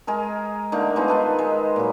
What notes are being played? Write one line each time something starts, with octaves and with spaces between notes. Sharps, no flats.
G#3 G#4 A#4
D3 A3 A#3 D#4
G#3 B3 D#4 F4
D#3 A4 B4
G#3
A#2 F#3